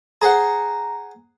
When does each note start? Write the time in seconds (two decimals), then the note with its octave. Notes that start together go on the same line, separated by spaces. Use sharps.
0.22 G#4 C5 F#5 A#5